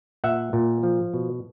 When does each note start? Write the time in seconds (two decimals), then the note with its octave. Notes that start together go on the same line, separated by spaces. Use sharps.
0.24 A#2 E5 F#5
0.53 A#2
0.83 F3
1.14 B2